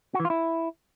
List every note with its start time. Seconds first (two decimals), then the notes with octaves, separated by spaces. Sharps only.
0.14 F#4
0.20 E3
0.25 F4
0.30 E4